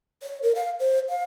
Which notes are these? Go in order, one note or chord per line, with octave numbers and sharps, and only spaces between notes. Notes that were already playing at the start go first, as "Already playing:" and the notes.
C#5
A#4
F5
C5
F5